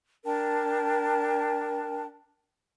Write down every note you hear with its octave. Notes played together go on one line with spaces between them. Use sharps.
D4 A#4 G5 A5